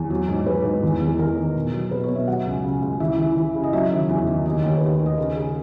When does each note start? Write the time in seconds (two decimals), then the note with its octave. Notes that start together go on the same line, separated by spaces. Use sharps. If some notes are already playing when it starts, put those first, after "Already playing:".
Already playing: E2
0.10 F#3
0.28 G#2
0.46 G#2 B4
0.65 G#2
0.83 E2
1.01 E2
1.19 E2 A#4
1.37 D#3
1.55 B2
1.73 F#3
1.91 B2 B4
2.04 C#5
2.09 B2
2.15 E5
2.28 F#3 F#5
2.46 C#2
2.64 C#3
2.82 C#2
3.00 E3 E5
3.18 E3
3.36 E3
3.55 C#3
3.63 D#5
3.73 F#3 E5
3.91 D#3
4.09 E2
4.27 D#3
4.46 D#2 D#5
4.63 D#2 C#5
4.77 B4
4.81 D#2 C#5
4.94 D#5
5.00 D#3
5.06 D#5
5.18 C#3 A#4
5.36 C#3 G#4